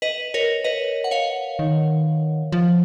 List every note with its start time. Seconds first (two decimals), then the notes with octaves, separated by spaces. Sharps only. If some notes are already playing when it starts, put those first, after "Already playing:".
0.02 B4 D#5
0.34 A#4 C#5
0.64 B4 D#5
1.04 F#5
1.11 C#5 F5
1.59 D#3
2.52 F3